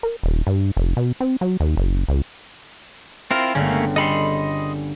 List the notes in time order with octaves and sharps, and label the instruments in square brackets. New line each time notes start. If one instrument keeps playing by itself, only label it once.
[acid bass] A#4
D#1
G2
F1
B2
C4
F#3
D#2
F#1
C#2
[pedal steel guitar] C4 E4 F4 [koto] A#4 A#5
[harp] G1 [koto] C#3 [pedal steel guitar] A3 A#3 C#4
[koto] C#3 G3 A4 [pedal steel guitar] D#5 B5 C6